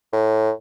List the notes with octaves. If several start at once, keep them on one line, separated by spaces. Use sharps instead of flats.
A2